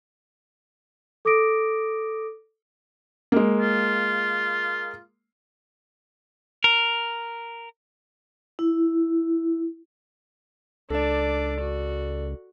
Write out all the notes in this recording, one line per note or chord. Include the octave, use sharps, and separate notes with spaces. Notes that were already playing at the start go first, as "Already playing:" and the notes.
A4 D6 D#6 A#6 D7
G#3 A#3
F4
A#4
E4
C#2 D4 A4 D5 D6
F#4